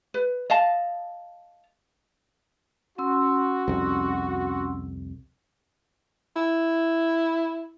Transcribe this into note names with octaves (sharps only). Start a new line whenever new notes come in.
B4
D#5 F5 A5
C#4 F#4 C6 E6
C2 F2
E4